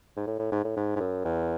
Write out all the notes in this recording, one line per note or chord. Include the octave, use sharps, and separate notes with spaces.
G#2
A2
A2
G#2
A2
G#2
G#2
F#2
E2